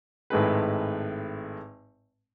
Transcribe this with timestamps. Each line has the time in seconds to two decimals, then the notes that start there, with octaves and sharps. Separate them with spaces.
0.30 G#1 A2 G#3 B4